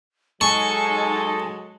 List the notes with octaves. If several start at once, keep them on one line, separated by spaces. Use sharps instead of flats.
F#3 G#3 D#4 A4 G#5 C#6